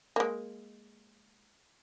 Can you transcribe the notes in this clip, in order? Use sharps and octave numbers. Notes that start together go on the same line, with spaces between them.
G#3 A#3